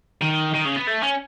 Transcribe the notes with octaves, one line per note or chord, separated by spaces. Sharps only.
D#3
D#3
C#3
B3
A3
C#4